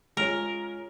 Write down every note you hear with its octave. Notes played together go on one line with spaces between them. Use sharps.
G#3 C#4 F4 G#4 A#4 C#5